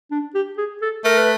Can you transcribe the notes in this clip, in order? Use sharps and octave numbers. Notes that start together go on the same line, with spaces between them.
D4
G4
G#4
A4
A3 A#4
B4